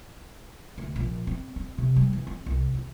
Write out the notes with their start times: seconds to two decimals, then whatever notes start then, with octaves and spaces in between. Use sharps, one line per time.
0.78 D2
0.96 A#1
1.27 C4
1.56 C4
1.78 C3
1.96 G3
2.13 E3
2.27 C4
2.46 C2
2.74 D#2